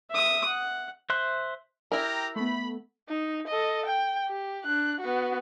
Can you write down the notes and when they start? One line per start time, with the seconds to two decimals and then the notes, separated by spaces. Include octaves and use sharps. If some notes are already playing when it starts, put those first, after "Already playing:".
0.10 E5 D#6
0.47 F#5
1.10 C5 E5 C6 F#6
1.92 E4 G4 A#4 G5 A#5
2.36 A3 B3 B5
3.09 D#4
3.47 A4 D#5
3.86 G5
4.28 G4
4.64 D4 F#6
5.00 B3 F#4